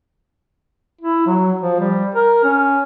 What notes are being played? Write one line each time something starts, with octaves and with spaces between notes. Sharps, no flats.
E4
F#3
F3
G3
A#4
C#4